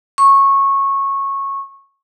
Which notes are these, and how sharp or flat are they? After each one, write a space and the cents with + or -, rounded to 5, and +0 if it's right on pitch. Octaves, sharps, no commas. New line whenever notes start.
C#6 -15